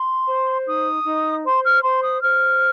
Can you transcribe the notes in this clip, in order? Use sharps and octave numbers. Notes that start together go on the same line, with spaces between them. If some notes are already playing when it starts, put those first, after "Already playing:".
Already playing: C6
C5
D#4 D#6
D#4
C5 C6
F6
C5 C6
D#6
C5 F6